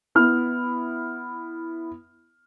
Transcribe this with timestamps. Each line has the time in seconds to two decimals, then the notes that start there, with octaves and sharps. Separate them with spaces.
0.15 B3 E4 F6